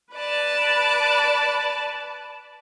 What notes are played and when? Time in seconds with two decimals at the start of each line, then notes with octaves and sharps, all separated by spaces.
0.14 B4 D5 A5